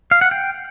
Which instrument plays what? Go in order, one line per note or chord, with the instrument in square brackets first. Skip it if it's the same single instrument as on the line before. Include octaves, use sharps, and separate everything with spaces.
[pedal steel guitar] F5
F#5
G5